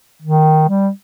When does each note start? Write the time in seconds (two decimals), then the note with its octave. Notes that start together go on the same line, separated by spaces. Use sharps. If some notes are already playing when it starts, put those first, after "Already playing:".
0.22 D#3
0.69 G3